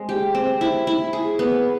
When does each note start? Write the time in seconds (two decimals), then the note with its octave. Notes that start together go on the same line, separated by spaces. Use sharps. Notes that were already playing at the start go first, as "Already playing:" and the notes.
Already playing: G#3 C4
0.09 G4
0.35 C4
0.61 E4
0.87 E4
1.13 G#4
1.39 B3